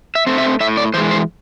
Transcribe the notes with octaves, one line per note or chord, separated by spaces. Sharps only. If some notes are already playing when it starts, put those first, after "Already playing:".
E5
A3 C4
E5
A2 E5
D5
E3 G#3 C5
C5